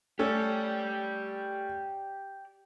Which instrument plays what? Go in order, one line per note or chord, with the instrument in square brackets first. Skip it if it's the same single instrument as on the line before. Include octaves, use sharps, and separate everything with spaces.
[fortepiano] A3 C#4 A4 [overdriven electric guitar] G4 D5